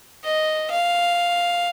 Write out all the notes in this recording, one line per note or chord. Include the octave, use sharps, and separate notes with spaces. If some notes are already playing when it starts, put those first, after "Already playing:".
D#5
F5